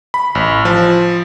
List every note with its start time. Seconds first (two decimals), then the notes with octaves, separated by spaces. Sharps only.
0.14 B5
0.35 A1
0.65 F3